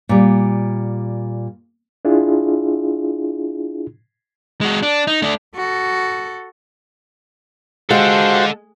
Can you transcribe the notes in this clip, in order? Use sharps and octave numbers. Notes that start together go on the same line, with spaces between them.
A#2 G3
D4 E4 F4 G#4
G#3 F#4
D4
D#4
A3 D4
F#4 A4
G#3 F#4 G4 A4 C5 F5 F#5